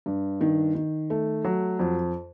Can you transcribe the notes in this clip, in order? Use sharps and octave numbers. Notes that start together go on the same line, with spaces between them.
G2
D#3
D#3
A3
F#3
F2